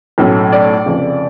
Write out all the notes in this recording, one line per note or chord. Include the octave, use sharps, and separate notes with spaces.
B1 A2 F#3 A3 C#4
D5
F1 F2 C#3